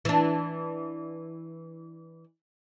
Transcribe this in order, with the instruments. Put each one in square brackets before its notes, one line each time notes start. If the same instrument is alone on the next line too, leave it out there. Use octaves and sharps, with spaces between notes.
[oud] E3 D4